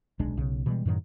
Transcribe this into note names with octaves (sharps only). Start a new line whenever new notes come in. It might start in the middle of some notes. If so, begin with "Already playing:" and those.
D1 B1 G#3 D4
B1 C#3
B2 E3 G3 G#3
F#2 A2 D#3 F#3